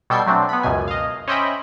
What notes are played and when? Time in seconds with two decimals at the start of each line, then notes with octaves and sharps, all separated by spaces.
0.10 B2 G3 A4 G5 G#6 C7
0.26 F#3 A3 C4 D4
0.49 B3 B5
0.63 C#2 F#2 B2 G#5
0.88 D#5 F5
1.27 C#4 C5 D#5 E5 G5 B5